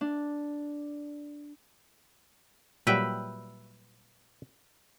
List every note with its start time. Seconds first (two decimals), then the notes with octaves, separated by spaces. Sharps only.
0.01 D4
2.87 A#2 F#3 G3 B4 E5 G5